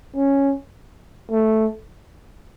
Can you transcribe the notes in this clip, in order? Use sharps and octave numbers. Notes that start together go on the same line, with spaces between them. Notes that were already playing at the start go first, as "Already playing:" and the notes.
C#4
A3